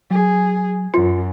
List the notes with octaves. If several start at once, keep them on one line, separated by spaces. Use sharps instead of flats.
F#3 G#4
F#2 F4